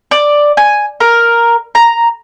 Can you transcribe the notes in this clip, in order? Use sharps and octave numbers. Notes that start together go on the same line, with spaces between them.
D5
G#5
A#4
A#5